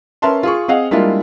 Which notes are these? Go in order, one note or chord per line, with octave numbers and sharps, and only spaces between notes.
C#4 A#4 B4 E5 A5 C6
F4 G#4 C#6
C4 G#4 D#5 F5 F#5
G3 G#3 A#3 D4 E4 F4